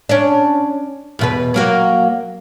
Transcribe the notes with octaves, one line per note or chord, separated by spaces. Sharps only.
C#4 D4
E2 B2 B4
F#3 A#3 F#4